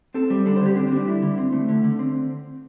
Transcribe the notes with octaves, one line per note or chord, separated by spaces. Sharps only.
C4 A4
G3
D3 A4
C5
D3
G4
C4 D4
C4
G3
D4
D3 E4
D3
C4
A3
D3
D3
C4